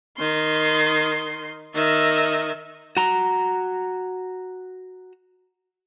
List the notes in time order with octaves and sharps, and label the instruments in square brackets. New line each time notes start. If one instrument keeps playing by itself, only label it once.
[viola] D#3 C6
D#3 E5
[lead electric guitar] F#4 A#5